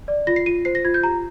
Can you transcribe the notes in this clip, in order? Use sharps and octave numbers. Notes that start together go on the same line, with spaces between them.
D5
F4 A#6
C7
F4 D#7
C5 C7
A#6
F4 G#6
G6
G4 A#5